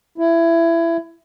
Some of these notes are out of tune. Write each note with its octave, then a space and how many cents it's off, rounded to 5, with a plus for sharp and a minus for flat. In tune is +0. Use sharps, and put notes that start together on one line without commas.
E4 +20